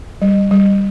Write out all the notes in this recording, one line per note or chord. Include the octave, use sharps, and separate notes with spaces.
G3
G3